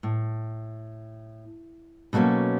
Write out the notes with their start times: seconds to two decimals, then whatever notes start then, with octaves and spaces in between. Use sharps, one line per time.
0.03 A2
2.13 B2 F#3 A3 A#3 C#4